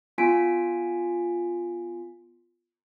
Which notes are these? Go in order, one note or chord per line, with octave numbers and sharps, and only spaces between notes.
B3 F4 G#5 B6 D7